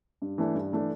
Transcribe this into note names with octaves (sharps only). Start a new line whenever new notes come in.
G2
E3 A3 D4
G2
E3 A3 D4